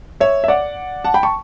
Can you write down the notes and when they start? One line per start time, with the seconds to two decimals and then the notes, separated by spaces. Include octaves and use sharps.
0.20 C#5 E5
0.44 E5
0.48 D5 F#5
1.04 F#5 A5
1.14 G5 B5
1.23 A5 C#6